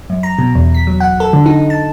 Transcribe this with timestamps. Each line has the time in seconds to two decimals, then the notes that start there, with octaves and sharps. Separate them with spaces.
0.10 F#2
0.23 A#5
0.39 B2
0.55 E2
0.74 B6
0.87 F#3
1.00 F#5
1.20 A4
1.33 D3
1.46 D#4
1.70 A5